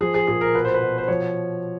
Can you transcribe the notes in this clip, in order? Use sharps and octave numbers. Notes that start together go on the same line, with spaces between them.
F3 G#4
G#4
A#2 G#4
A#4
B2 B4
C5
B4
B2
C5
F3 C#5